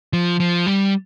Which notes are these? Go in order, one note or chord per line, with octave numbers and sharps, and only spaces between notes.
F3
F3
G3